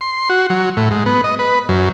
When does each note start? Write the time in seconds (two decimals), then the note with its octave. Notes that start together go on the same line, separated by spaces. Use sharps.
0.01 C6
0.29 F#4
0.50 F#3
0.77 A2
0.91 G#2
1.06 B3
1.24 D#5
1.39 B4
1.69 F#2